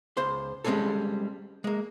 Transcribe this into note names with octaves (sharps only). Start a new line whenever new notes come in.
C#2 C5 C6
G3 G#3 A#3 C4 C#4 A4
G#3 A#3